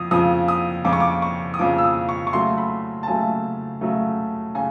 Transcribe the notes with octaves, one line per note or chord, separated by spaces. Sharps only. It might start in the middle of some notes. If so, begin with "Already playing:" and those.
Already playing: F2 D#6
F2 C#3 F3 D#6
D#6
F2 C#3 F3 D6
C#6
D6
C#6
D#6
F2 C#3 F3 D6
E6
D#6
C#6
C#6
C#3 F#3 A3 C6
B5
A5
C#3 F#3 A3 G#5
C#3 F#3 A3
C#3 G#5